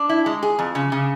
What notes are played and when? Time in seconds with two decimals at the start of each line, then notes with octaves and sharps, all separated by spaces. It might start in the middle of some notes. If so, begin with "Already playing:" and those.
Already playing: D4
0.09 E4
0.26 G#3
0.43 G#4
0.59 F2
0.75 C#3
0.92 C#3